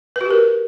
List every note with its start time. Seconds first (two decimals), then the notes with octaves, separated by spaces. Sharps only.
0.16 B4
0.21 F#4
0.26 G4
0.30 A#4